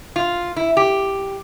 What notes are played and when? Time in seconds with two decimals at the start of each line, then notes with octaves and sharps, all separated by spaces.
0.16 F4
0.56 E4
0.77 G4